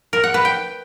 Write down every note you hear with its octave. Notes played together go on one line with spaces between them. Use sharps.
A#4
F#5
B4
G5